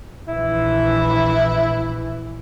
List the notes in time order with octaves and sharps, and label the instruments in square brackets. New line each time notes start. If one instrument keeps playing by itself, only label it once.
[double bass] A#1 E3 [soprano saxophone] E4